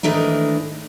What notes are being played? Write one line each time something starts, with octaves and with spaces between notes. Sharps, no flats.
G#2 D#3 E3 A3 D4 D#4